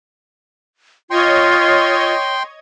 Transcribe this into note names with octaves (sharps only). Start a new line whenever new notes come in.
F4 C#5 D#5 G5 C6 G#6